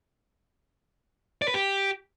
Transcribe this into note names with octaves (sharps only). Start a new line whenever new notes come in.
D5
B4
G4